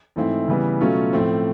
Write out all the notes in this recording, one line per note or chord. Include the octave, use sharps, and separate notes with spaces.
G#2 E3 A3 C4 E4
C#3 E3 G3 B3
B2 F#3 A3 C#4 F4
A2 F3 A3 C4